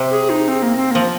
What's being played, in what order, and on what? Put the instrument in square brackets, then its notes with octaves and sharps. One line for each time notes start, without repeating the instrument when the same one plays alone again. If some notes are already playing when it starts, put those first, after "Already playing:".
Already playing: [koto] C3
[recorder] G#4
D#4
C4
A#3
C4
[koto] F3 [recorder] A#3